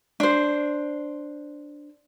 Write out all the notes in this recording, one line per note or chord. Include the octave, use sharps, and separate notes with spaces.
D4 C5